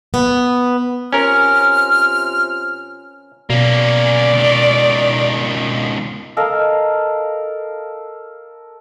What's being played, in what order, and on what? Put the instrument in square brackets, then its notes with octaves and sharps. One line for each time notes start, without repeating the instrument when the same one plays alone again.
[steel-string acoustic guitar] B3
[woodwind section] C3 F4 F6 [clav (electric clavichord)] C#4 A#4
[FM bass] B2 [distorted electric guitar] A#3 C#4 [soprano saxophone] D5
[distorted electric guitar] C#2 D#3
[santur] A4 A#4 D#5 F5